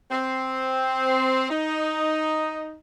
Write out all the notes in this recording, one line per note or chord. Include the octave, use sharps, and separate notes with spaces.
C4
D#4